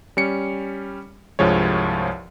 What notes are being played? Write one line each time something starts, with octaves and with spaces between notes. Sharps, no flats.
G3 C#4 C#7
C2 G2 F3 G#3 C#5